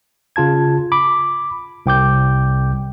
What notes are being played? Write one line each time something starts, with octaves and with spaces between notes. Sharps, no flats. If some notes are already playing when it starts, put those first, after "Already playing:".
C#3 F4 A5 G#6
B5 D6
C2 G5 D6 G6